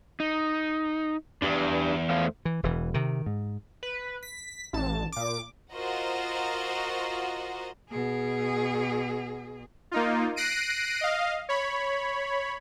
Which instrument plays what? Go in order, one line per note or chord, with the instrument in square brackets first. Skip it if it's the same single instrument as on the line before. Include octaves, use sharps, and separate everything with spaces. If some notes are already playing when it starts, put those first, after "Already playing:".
[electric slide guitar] D#4
[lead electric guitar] E2 [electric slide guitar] D4 G4 D5
[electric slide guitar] A3 C5 F5
[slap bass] E3
E1 E3
C3 D#3
G#2
[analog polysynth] B4
B6
A1 A5
A#2 D6
[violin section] F4 F#4 A#4 C5 D#5 F#5
[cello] B2 G#4
[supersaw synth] A#3 D#4 F4
F#6 A#6 C7 D7 D#7
D#5 F5
C#5 B5